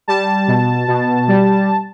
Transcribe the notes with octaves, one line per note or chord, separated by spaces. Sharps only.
G3 A5
B2
B2
G3